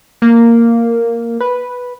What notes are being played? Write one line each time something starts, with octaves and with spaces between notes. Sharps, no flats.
A#3
B4